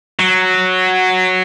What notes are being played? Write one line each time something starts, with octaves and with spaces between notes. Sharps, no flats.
F#3